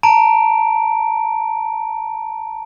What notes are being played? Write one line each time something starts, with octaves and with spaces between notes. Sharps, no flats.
A5 A#5 D7